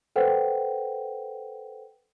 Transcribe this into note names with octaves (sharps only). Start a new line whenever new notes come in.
A4 B4 C5 F#5 G5